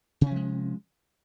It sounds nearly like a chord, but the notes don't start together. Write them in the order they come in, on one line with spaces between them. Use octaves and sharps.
C3 C#4 F3 G#3